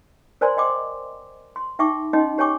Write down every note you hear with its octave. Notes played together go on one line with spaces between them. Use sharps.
A#4 C5 D5 G#5 A#5 C6
D#5 G5 C6 D6
C6
D#4 E5 G5 C#6 D6
C#4 D#4 D#5 G5 C6
G4 C#5 G5 G#5 C#6 D6